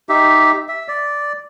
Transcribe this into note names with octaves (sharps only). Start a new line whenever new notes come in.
D#4 G4 E5
E5
D5